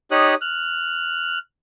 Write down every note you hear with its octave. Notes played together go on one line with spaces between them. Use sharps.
D#4 G4 C#5 D#6 F#6
F6 F#6